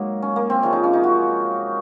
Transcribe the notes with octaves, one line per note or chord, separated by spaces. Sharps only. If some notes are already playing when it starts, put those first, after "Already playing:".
Already playing: G#2 F#3 A#3
C#4
A#3
C4
C3 F3 G#3 C#4
D#4
C#4
D#4
F#4